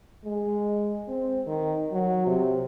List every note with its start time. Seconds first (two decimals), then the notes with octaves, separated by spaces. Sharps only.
0.25 G#3
1.08 C4
1.47 D#3
1.91 F#3
2.26 C3